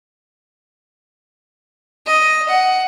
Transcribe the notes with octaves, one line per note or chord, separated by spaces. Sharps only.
D#5
F#5